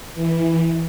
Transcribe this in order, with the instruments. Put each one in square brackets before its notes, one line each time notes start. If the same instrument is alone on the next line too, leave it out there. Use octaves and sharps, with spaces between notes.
[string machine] E3